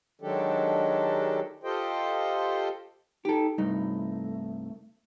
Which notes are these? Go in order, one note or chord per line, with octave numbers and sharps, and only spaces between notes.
D#3 F#3 G#3 D4 G4 A4
F4 G4 A4 C5 D#5 G5
D#4 G4 A4
C2 G2 A3 D#4